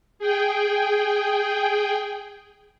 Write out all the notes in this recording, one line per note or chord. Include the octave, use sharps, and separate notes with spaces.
G#4 G5